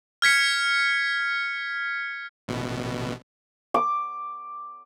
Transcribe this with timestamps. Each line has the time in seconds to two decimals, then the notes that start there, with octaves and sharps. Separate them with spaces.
0.22 F6 G#6 B6 C#7
2.48 A1 B2
3.74 D6